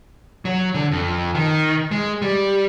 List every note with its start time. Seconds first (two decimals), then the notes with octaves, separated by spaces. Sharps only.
0.45 F#3
0.74 D3
0.91 F2
1.35 D#3
1.91 G#3
2.22 G3